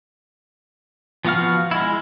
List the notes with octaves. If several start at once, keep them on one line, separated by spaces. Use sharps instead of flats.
F3 B3 F#4 F5 F6
G#3 E4